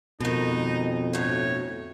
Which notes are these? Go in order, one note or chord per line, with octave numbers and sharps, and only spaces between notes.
F2 G#2 B2 D#3 D#4
D2 A2 C#5